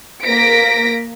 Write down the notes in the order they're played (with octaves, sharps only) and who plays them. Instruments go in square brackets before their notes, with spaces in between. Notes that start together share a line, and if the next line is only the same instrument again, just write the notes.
[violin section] A#3 A#6 B6 D7